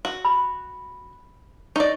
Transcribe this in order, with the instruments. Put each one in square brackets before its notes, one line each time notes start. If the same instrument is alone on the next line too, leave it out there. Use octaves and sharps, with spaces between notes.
[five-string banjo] F#4
[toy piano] B5
[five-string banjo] D#4 D5 [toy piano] C#6